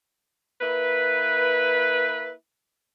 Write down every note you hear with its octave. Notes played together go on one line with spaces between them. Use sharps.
A#3 E4 B4